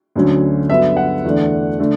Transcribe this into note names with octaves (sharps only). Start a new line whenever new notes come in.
D2 D3 F#3 C#4
G2 D3 F#3 B3 E5
F#5
E2 D3 A3 D4
D3 A3 D4